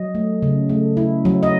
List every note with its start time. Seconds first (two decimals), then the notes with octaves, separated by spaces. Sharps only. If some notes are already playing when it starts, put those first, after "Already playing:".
Already playing: F#3 D#5
0.15 A3
0.42 C#3
0.69 A3
0.97 E4
1.25 F#3
1.43 D#5